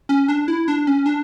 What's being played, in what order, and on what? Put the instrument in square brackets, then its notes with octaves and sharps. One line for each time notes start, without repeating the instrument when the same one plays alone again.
[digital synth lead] C#4
D4
E4
D4
C#4
D4